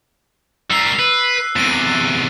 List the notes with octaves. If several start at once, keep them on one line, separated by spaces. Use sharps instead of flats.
G3 A#4 E6 C7
B4
F#6
E2 C3 A6 D7 D#7